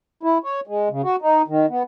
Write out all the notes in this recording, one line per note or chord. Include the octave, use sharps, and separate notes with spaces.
E4
C#5
G#3
C#3
F#4
D#4
D#3
B3